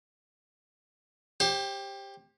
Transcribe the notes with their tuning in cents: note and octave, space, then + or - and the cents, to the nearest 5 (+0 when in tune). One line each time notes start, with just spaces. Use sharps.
G4 +10 C5 +35